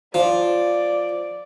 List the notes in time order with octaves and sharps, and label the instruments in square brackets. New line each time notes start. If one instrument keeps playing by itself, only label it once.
[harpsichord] F3 [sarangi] D5